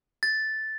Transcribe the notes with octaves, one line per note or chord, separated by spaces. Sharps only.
A6